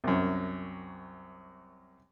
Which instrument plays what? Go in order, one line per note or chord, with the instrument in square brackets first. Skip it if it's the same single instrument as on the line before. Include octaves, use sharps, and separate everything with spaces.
[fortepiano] C2 F#2